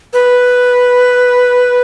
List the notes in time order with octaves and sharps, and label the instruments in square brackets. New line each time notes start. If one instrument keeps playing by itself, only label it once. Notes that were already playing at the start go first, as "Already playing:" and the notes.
[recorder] B4